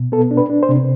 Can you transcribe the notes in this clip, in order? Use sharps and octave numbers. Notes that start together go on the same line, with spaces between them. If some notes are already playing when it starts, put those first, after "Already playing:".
Already playing: B2
B3 A4
D4
B4
D4
C5
C3